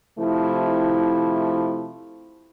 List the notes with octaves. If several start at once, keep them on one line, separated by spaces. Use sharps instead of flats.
C3 F3 A3 E4